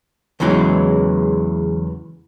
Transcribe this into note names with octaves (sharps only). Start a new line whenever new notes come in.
E2 C#3 E3 F#3 G#3